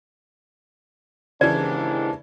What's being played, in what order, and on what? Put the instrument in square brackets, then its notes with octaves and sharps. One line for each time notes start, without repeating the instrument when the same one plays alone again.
[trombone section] D#2 G#2 D4 [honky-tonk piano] C#3 E3 [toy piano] D5